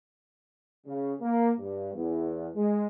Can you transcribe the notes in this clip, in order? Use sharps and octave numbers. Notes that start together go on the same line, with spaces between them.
C#3
A#3
G2
E2
G#3